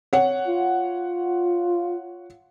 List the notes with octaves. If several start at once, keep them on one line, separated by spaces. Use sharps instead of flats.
C#5 F#5
F4